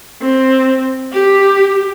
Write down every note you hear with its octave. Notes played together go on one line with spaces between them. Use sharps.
C4
G4